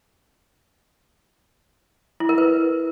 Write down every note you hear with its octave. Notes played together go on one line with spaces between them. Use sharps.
E4
A#4
B4